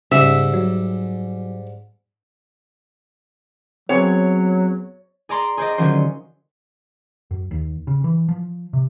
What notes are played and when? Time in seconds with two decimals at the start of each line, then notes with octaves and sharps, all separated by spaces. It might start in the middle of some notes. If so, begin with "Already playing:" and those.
0.12 G#2 C#3 G3 E5
0.54 F#3
3.89 F#3 B3 C4 G#4 C#5
5.29 G#4 D5 A#5 C6
5.57 G#4 C5 D5 D#5
5.78 D3 D#3 F3 F#3 C#4 C5
7.31 F#2
7.51 D#2
7.87 C#3
8.04 E3
8.28 F3
8.73 C3